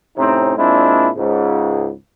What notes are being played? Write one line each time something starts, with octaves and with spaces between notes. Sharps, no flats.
A2 C3 C4 C#4 D#4
A#2 G#3 C4 D4 E4
C#2 G#2